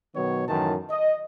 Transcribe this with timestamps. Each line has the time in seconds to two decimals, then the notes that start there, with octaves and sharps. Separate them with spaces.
0.15 B2 D#3 F#3 B3 C#5
0.48 F#2 A2 D#3 E3 A5
0.91 D#5